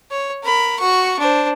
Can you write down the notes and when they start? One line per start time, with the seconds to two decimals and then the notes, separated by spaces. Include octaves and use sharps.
0.11 C#5
0.43 A#4 B5
0.79 F#4 C#6
1.19 D4 C5